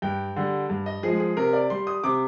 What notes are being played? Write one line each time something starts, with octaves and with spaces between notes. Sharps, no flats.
G2 G5
D3 G3
G2
D#5
F3 G#3 G#4
G#4
C3 A#4
D5
G3 C6
D#6
C3 D6